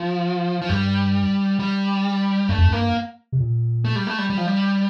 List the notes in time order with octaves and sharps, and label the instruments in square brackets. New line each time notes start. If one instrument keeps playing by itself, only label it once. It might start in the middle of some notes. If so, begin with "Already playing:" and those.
Already playing: [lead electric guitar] F3
F3
[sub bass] G2 [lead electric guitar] G3
[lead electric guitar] G3
[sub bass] G2 [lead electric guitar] A3
[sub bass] F2
[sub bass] G2 [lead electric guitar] A#3
[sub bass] C3
A#2
[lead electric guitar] A3
G3
A3
G3
G3
F3
G3